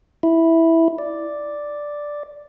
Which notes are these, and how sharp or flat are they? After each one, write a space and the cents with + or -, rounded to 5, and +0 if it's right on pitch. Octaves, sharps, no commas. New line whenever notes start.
E4 -5
D5 +0